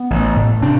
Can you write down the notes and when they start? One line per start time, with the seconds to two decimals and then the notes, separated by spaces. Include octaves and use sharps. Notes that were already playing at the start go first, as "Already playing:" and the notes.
Already playing: B3
0.10 A1
0.36 A2
0.62 C3 C4 D4